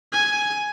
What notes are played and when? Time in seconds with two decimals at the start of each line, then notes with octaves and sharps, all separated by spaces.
0.13 G#5